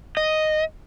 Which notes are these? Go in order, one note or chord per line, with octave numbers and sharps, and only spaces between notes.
D#5